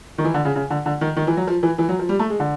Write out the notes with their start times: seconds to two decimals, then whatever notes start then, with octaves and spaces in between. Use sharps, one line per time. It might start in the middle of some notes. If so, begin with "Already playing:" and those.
0.18 D#3
0.25 E3
0.34 D3
0.45 C#3
0.55 C#3
0.70 D3
0.86 D3
1.01 D#3
1.17 D#3
1.27 E3
1.37 F#3
1.47 F3
1.63 E3
1.78 E3
1.89 F#3
1.99 F3
2.09 G3
2.19 A3
2.30 G#3
2.40 D3